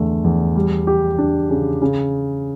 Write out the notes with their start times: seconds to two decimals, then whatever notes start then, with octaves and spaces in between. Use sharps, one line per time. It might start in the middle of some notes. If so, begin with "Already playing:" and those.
Already playing: E2 D3 A3
0.24 E2
0.56 G3
0.87 G4
1.18 D4
1.50 C#3
1.82 C#3